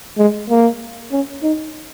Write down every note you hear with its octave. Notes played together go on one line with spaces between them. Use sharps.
G#3
A#3
C#4
D#4